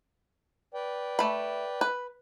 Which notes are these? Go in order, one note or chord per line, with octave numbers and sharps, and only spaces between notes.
B4 D5 G5
A3 B5
B4